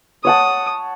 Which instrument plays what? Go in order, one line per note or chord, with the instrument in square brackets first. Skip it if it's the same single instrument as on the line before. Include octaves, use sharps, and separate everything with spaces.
[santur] C#5 F#5 A5 [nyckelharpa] D#6